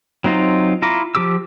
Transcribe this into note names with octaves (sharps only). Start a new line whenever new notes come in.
F#3 C4 D#4 F4
E4 F4 A#5 D6
F3 G4 D6 E6